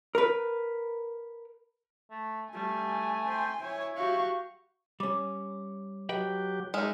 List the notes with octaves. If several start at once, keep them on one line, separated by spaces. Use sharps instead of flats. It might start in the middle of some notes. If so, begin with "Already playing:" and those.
A#4 B4
A3
G3 A3 G#5
C5 G5
E4 C#5
F#4 G4 F5 C#6
G3 C#4 C#5 D6
F#3 G4 B4 D#5 G5
G#3 D#4 E5 F6